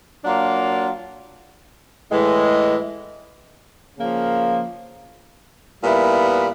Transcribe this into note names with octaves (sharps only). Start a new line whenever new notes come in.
F#3 A#3 D4 F4
A2 E3 G#3
C#3 F3 A#3
A#2 G3 B3 E4